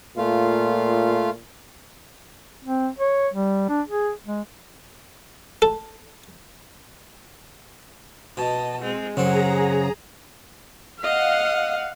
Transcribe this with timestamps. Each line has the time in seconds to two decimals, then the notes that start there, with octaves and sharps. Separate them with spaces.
0.17 A#2 A3 F4 F5
2.64 C4
2.99 C#5
3.34 G3
3.69 D4
3.88 G#4
4.26 G#3
5.62 A4
8.37 B2 D#5 A5
8.82 G#3 C4
9.17 F#2 C#3 C4 G#4 F#5 A#5
11.03 D#5 F5 F#5